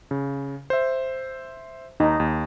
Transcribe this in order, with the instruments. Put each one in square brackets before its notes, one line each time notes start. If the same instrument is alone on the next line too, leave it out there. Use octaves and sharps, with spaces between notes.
[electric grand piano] C#3
C5 E5
[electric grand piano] D#2 [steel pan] D#4
[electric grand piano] D#2